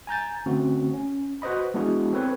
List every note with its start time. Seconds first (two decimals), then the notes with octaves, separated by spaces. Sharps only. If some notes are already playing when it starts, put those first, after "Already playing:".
0.07 G#5 A#5 G6 A6
0.46 D3 A3 C4 C#4 F#4
0.94 C#4
1.42 F#4 B4 C5 D#5 B5
1.74 G#3 B3 D4 E4 F#4 G#4
2.13 C4 A4 B4 C#5